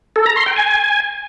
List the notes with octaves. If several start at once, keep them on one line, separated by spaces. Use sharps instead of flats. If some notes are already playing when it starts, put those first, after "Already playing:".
A4
A#5
C6
G5
G#5